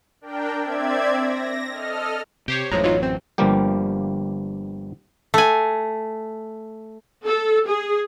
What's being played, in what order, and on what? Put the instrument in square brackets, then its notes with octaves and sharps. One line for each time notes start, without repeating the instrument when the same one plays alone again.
[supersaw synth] D4 A#4 G5
C4 D5 E5 G#6
A#6
A4 D#5 F6
[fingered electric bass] C3 [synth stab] G4 C5 C#5
[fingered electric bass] A1 F#2 A2 [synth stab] E3 F3 G#3 [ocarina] C#5 [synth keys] A#5
[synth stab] E3 F#3 [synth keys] D#4 F4
[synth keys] C4
[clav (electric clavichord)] G1 G2 F3 G3 A#3 G4
[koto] A3 G#5
[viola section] A4
G#4